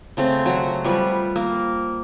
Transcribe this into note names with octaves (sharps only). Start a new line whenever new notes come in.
C#3 A3 C4
F#3 F#4
F3 G3 B4
A#3